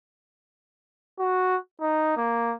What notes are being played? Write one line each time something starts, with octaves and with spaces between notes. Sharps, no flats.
F#4
D#4
A#3